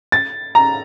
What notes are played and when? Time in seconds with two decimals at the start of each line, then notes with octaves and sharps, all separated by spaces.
0.12 A6
0.55 A#5